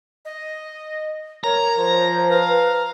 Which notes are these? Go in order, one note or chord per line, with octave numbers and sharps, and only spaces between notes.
D#5
A#4 C#5 A#5
F3 C5
B4 F5